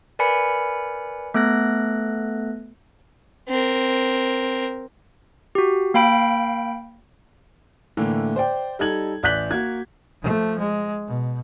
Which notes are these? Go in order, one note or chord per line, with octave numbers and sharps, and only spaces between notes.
A#4 B4 D5 G#5 B5 C#7
A3 B3 A4 F#6 A#6
C4 A#4
F#4 G4
A#3 F5 G5 B5 G6 D7
A2 D3 E3 A#3
C5 D5 G5
G3 D#4 A4 G#6 F#7
A1 D5 F#6 G6 B6 F#7
A#3 F#4 G#6
F3 A3
G#3
B2